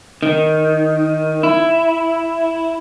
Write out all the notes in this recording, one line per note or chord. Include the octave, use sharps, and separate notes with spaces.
D#3
E4